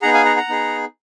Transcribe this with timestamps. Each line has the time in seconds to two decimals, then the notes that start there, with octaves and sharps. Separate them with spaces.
0.02 B3 D#4 G#4 F#5 A#5
0.14 F5 G#5
0.25 F#5 A#5
0.37 F#5 A#5
0.49 B3 D#4 G#4